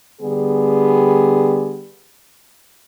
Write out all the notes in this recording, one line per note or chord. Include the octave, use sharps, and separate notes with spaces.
D3 G3 B3 G4 G#4